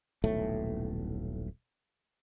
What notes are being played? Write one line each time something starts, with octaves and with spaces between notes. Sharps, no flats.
D#1 B1 A2 A3